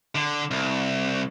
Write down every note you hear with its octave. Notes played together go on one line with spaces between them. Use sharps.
D3
C2